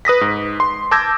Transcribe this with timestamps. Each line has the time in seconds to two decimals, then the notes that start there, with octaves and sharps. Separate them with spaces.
0.05 B4 D#6 A#6 B6
0.21 G#2
0.60 C6
0.91 A5 D6 E6 G6 G#6 A#6